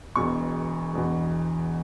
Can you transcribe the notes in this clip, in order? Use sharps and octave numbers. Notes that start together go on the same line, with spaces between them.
E1 E2 B2 C#6
E1 E2 B2